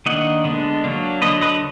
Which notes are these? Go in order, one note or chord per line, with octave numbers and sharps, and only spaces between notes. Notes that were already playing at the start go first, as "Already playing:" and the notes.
D#3 A#3 D4 D#5 F#5
D3 G#3 B3 D4
F#3 A#3 D4
D3 F#3 D4 B4 D#5
B4 D#5